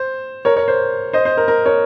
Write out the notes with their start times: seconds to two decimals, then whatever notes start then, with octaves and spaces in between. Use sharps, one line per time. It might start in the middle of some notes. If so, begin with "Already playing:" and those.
Already playing: C5
0.45 A#4 C#5
0.56 A#4 C#5
0.68 C5
1.13 C5 D#5
1.25 C5
1.37 A#4
1.48 A#4
1.66 A#4 C#5